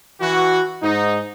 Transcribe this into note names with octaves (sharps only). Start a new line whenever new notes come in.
E3 F#4
G#2 D#4